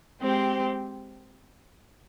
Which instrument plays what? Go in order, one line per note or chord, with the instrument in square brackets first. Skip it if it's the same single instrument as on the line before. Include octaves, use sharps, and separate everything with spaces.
[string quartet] G#3 C4 G4 C5